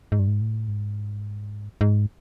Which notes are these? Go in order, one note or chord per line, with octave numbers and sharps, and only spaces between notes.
G#2
G2
G#2
A2
G#2
G#2